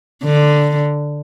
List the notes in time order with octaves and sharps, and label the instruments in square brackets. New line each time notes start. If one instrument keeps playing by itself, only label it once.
[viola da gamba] D3